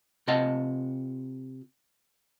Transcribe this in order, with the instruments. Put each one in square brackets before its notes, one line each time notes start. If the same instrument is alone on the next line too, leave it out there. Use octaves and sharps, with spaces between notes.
[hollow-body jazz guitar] C3 F4 D#5 F#5 A5